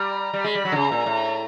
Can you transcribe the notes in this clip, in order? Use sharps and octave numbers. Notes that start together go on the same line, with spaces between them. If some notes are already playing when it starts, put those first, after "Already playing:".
Already playing: G3 A#5
G3
G#3 B5
G3
F#3
D3
C#3 A#5
A#2
A2